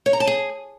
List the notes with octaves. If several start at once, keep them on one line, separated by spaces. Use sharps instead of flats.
C#5
A#5
A5
G#4